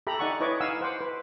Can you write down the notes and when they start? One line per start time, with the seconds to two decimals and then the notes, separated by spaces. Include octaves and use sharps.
0.07 G4 A4 E5 A#5 B5
0.19 D#4 D5 F#5 G#5 C#6
0.40 E4 B4 C#5 D#5 C#6 D6
0.60 D#4 F5 F#5 G#5 E6
0.81 C5 F#5 C6 D6
1.01 B4